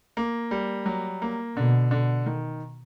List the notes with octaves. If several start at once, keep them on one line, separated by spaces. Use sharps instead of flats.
A#3
G3
F#3
A#3
B2 D3
D3
D#3